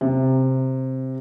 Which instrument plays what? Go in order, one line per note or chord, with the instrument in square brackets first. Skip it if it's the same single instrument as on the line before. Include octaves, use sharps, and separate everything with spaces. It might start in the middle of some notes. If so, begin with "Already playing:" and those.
[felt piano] C3